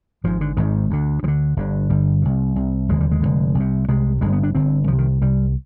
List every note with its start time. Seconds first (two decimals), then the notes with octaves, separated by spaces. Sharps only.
0.24 G#1 G#2 F3
0.41 D3
0.57 G#1 G#2 D#3
0.91 D2 D3
1.23 D2 F3
1.28 D3
1.57 G1 G2 D3
1.89 G1 G2 D3 G3
2.22 C2 C3
2.56 C2 C3
2.89 F1 D#2 D3 G#3
3.01 G3
3.11 G#3
3.22 F1 D#2 D3
3.55 C2
3.60 C3
3.88 C2 C3 G#3
4.21 G1 G2 D3 G#3
4.33 B3
4.43 D4
4.54 G1 G2 D3 C4
4.88 C2 F3
4.93 C3
4.98 D#3
5.21 C2 C3 G3